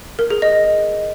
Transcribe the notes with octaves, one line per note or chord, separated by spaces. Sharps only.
A#4
G#4
D#5